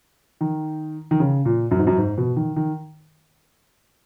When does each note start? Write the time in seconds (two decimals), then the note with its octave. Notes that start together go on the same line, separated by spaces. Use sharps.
0.41 D#3
1.11 D#3
1.20 C#3
1.45 A#2
1.71 F#2
1.79 G#2
1.87 F#2
1.98 G#2
2.18 B2
2.36 D#3
2.56 D#3